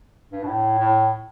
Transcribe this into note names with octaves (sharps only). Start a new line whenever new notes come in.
G2
B2
A2
A2